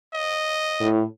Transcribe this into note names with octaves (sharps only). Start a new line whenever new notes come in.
D#5
A2